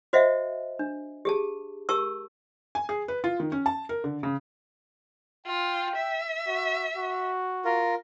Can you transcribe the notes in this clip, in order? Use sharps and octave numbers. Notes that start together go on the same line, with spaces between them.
F#4 C5 D#5 E5 F#5
D4
G4 G#4 A5
G4 A#4 A5 C#6 E6
G#5
G#4
B4
F4
D#3
C#4
A5
A#4
D3
C#3
F4 G5
E5
F#4
F#4
F4 A#4